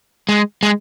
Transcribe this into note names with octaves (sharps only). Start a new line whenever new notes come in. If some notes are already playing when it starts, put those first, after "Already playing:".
G#3
G#3